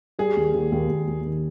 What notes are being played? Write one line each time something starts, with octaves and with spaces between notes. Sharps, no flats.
G3 G#4
D#2
D#2
D#2
D#2
D#2
D#3